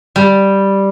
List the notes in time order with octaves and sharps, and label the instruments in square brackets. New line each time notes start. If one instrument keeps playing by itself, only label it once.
[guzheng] G3